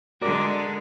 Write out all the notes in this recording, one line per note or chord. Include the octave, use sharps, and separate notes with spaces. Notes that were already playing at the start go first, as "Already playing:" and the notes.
D3 G#3 F#4 A#4 D5